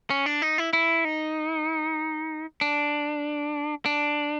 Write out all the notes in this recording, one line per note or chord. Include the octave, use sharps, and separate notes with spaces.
C#4
D4
D#4
E4
E4
D#4
D4
D4